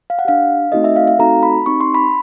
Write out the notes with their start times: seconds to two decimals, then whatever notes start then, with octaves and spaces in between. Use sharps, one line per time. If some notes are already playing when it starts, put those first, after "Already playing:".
0.10 F5
0.19 F#5
0.25 D4 G4 F5
0.72 A3 C4 D#4 F#4 A4 D#5
0.84 E5
0.96 F5
1.08 F5
1.19 A3 C4 D#4 F#4 A4 A#5
1.43 B5
1.66 C4 D#4 G4 C#6
1.80 C6
1.94 B5